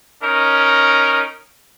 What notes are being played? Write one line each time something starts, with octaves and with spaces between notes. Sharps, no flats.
C#4 D#4 A#4